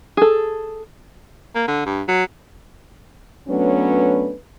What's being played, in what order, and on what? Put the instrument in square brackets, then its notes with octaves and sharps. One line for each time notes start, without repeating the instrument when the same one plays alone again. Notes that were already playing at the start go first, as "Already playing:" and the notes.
[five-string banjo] G#4 A4
[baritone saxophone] A#3
D3
G2
F#3
[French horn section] F#3 A3 B3 C#4 D4 B4